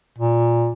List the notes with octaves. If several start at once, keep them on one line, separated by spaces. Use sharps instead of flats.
A#2